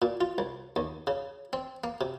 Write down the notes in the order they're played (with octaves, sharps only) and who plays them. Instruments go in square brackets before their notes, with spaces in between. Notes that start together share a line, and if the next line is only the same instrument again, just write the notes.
[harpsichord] A#2
F4
C2
D#2
C#3
C4
A#3
C3